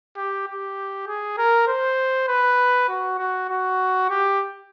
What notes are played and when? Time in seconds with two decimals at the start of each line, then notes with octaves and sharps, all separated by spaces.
0.17 G4
0.48 G4
1.07 G#4
1.38 A#4
1.68 C5
2.28 B4
2.89 F#4
3.18 F#4
3.49 F#4
4.09 G4